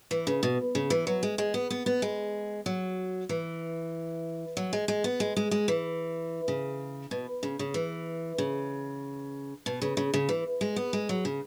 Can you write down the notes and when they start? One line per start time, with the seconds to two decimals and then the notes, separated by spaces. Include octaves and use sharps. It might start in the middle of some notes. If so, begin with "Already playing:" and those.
0.11 E3
0.27 C#3
0.43 B2
0.75 C#3
0.90 E3
1.07 F#3
1.23 G#3
1.38 G#3
1.54 B3
1.70 B3
1.86 B3
2.02 G#3
2.66 F#3
3.29 E3
4.57 F#3
4.73 G#3
4.88 G#3
5.04 B3
5.20 G#3
5.36 G#3
5.51 G#3
5.68 E3
6.48 C#3
7.11 B2
7.43 C#3
7.59 C#3
7.74 E3
8.38 C#3
9.66 B2
9.82 C#3
9.97 C#3
10.14 C#3
10.29 E3
10.61 G#3
10.76 B3
10.93 G#3
11.09 F#3
11.25 C#3